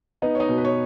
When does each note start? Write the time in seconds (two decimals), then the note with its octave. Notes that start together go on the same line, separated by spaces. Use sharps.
0.22 B3 D#4 D#5
0.35 C#5
0.40 D#4 D#5
0.49 B2
0.58 B4
0.65 C#5